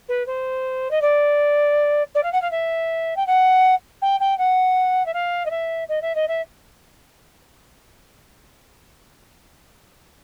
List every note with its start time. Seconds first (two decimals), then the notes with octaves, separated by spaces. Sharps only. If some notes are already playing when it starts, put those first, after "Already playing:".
0.08 B4
0.26 C5
0.91 D#5
1.01 D5
2.15 D5
2.23 F5
2.32 F#5
2.42 F5
2.51 E5
3.16 G5
3.26 F#5
4.02 G5
4.20 G5
4.38 F#5
5.06 E5
5.13 F5
5.45 D#5
5.50 E5
5.89 D#5
6.02 E5
6.15 D#5
6.28 E5